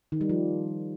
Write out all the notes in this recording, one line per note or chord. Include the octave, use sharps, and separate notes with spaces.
D#3
G3
F3